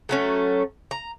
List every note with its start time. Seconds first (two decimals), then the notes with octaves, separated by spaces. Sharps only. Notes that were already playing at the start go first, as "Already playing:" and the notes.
0.09 F#3 A3 C#4
0.91 A#5